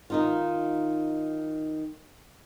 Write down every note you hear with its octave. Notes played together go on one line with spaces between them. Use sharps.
D#3 D#4 F4